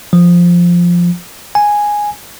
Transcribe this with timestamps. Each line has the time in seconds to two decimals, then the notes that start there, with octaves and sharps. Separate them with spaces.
0.13 F3
1.55 G#5